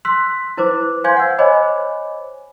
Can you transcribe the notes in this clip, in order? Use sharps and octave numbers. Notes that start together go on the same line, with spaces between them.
C6 E6 F#6 B6
E4 B4 C5 D6
C5 F5 G#5 C6 G6 G#6
F#5 E6
C5 C#5 D#5 G#5 B5 D6